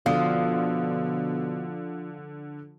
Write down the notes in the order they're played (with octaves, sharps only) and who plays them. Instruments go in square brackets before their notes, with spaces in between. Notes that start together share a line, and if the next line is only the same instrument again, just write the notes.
[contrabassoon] B2 [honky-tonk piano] D3 [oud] F3 [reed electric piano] F5 D#6